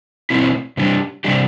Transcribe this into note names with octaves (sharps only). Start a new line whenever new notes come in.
B2 A3 C4 E4
C3 G3 D4 G4
C3 G3 D4 G4